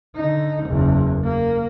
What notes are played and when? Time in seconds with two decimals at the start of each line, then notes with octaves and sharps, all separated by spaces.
0.16 D3 D#4
0.67 F#1 E2
1.25 A#3